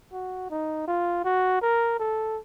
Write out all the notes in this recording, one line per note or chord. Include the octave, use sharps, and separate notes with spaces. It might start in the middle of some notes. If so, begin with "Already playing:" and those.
F#4
D#4
F4
F#4
A#4
A4